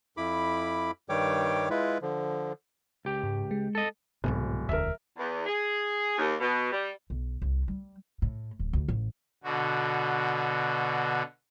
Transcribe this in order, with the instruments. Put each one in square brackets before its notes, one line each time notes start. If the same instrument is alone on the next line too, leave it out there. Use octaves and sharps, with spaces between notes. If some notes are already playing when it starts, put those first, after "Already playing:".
[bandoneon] F2 E4 B5 D6
G2 D#3 G3 C#5 G5 D6
G#3 E4 F4 B4
D3 F3
[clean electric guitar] C#2 G4
[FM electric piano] G#2
G#3
[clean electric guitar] A4 D#5
[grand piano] D1 [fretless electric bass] C2 G#2 B2
[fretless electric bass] E1 D2 [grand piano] A#4 E5
[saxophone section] E2
G#4
D#2
B2
G3
[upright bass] B1
C2
G3
A2
D1
D2
A1
[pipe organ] B2 D3 F#4